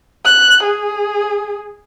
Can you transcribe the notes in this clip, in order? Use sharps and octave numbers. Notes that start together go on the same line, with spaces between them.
F#6
G#4